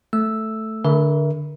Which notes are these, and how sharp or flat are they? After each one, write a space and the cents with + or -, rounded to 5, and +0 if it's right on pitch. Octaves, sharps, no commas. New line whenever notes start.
A3 +0 E6 +0
D3 +0 A#4 +30 E5 +0